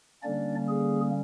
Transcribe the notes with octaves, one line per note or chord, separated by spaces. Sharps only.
D3 G3 A#3 C#4 D4 D5
G#4